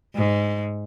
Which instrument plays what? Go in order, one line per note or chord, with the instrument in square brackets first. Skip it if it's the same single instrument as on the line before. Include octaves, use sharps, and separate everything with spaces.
[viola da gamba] G#2